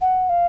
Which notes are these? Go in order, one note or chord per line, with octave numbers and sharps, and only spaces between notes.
F#5
F5